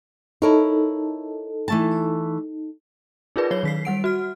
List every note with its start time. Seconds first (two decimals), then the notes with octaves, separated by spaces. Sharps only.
0.42 D#4 E4 A4 A#4 C#5
1.68 E3 A3 A5
3.36 D#4 F4 G#4 A#4 B4 D5
3.51 F#3 C#5 G7
3.63 D#3 B6 C7
3.85 G3 F#5 D7
4.04 F#4 F6